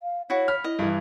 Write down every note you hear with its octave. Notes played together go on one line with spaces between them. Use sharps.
F5
E4 F#4 C#5
B5 F6
E4 D#5
G2 E3